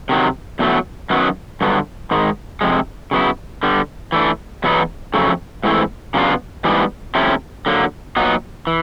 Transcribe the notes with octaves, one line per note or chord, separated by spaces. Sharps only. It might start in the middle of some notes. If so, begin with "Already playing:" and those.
C3 D#3 F#3
E2 B2 F#3 A3
F#2 D#3 F#3 B3
G2 D3 F#3 B3
G#2 D#3 G#3
F2 C3 F3 G#3
C#3 F#3 B3 E4
D3 G3 B3
E3 A3 D4
E2 B2 F#3 B3 D#4
F2 C#3 F#3 A3
G#2 E3 A3 C4 E4
C#3 F#3 B3 D4 F4
G#2 E3 G3 B3 D4
C3 F3 A3 C#4 E4
D3 F#3 A#3
A#2 F#3 B3 D#4
E3